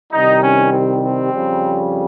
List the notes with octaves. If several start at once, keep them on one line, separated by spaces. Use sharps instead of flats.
C2 C3 D#3 G3 D#4
C#4
C4
C4
F2 C#3 G3